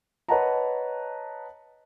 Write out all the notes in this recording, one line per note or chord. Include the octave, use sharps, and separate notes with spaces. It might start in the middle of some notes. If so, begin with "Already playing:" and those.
B4 C#5 D#5 F#5 A5 A#5